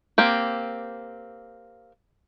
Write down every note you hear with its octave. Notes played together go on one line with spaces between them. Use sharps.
A#3 C4 G4